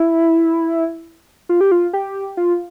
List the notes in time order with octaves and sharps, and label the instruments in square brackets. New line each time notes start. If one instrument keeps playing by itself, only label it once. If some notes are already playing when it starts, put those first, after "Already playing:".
Already playing: [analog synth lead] E4
F4
G4
F4
G4
F4